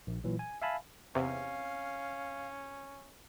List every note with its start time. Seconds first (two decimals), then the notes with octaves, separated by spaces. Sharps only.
0.07 A#1
0.24 A#2 E3 F#3
0.39 G#5
0.62 E5 F5 G#5 A5 B5
1.15 E2 C3 C#4 F5